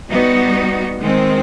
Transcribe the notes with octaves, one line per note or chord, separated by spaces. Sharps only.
G3 B3 D#4 F#4
D#3 G#3 C4